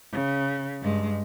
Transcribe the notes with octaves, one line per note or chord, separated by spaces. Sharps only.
C#3
G2 G#3